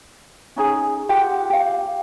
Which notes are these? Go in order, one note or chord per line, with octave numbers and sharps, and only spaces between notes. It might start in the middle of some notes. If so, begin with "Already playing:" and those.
C#4 D#4 G#4
F4 G4 F#5
G4 F5